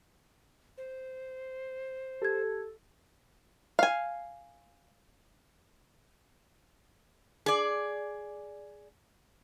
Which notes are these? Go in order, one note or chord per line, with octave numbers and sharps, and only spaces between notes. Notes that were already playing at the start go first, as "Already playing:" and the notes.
C5
G4 A4 G#6
F5 G#5
G#4 D5